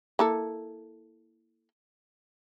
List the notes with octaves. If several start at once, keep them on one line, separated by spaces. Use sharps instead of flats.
A#3 E4 A4